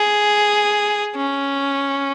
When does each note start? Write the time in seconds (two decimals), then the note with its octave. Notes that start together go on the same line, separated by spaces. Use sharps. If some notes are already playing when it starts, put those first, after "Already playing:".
Already playing: G#4
1.15 C#4